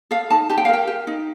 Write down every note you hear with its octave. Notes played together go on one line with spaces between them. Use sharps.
A4 F5
D#4 A5
G4 A5
G5
F5
A#4 G5
G4
D#4